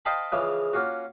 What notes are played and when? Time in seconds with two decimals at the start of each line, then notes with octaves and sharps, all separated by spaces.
0.05 C5 D#5 F5 G5 A5 B5
0.32 C#3 E3 F3 G#3
0.73 A#3 C#4 F4 F#4